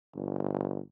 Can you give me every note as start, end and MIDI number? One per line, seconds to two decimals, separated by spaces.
0.14 0.80 31